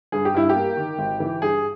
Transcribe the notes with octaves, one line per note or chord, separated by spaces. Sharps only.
G2 G#4
G4
G2 E4
G4
A#3
D#3
G#1
E3
G2 G#4